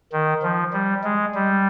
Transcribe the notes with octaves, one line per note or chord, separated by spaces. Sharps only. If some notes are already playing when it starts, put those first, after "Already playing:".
D#3
F3
G3
G#3
G3